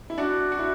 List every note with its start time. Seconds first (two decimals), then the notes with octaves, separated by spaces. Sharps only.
0.10 E4
0.18 D4 F#4
0.52 F#4
0.59 E4